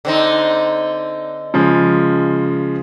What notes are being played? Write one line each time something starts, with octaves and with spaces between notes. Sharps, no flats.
D3 C4 D#4
C#3 F3 G#3